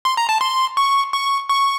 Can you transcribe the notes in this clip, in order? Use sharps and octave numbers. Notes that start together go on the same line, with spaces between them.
C6
A#5
A5
C6
C#6
C#6
C#6